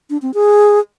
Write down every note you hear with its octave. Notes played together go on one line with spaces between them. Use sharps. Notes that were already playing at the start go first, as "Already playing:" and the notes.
D4
C4
G#4